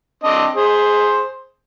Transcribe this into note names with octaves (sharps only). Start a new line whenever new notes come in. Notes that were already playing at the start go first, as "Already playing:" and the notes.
C4 D4 D#5
G#4 C5